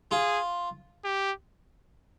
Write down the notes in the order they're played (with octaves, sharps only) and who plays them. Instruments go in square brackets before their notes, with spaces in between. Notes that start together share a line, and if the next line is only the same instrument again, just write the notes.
[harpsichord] F4 [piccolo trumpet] G#4
[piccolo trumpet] G4